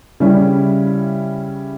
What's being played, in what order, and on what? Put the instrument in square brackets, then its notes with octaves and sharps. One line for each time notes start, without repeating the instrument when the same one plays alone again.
[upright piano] C#3 G3 C#4 E4